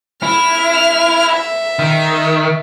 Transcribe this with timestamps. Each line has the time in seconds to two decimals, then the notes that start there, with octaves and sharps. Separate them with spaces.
0.23 E4 F6
1.32 E5
1.79 D#3